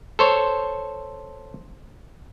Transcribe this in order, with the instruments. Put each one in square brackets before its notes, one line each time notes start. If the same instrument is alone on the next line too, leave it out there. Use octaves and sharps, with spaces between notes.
[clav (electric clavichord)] A4 C5 C#5